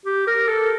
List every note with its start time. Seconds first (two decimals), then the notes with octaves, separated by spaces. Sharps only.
0.06 G4
0.27 A#4
0.48 A4